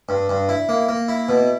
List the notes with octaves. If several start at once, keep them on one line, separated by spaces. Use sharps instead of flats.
G2
G2
E4
A#3
A#3
E4
B2